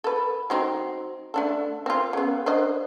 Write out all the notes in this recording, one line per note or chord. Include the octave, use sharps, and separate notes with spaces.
A4 B4
F#3 C4 D#4
A3 D4 A4
C4 F4
C#3 B3
D4 C5 D#5